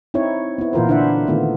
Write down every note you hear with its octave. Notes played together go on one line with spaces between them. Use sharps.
C4 D#4 E4 C#5
B3 E4
A#2 E3 F4 A#4 C5
D3 D4 E4 C5 E5 F#5
D#3 A3 B3 F4